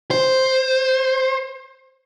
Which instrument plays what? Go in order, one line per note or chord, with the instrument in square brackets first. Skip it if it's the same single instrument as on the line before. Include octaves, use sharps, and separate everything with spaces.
[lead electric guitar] C5